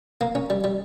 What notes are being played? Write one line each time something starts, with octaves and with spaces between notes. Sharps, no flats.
A#3
C#4
G3
G3